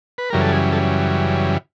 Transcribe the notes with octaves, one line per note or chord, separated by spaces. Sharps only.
B4
F#2 C#3 E3 G3 A#4
A4
G#4
A4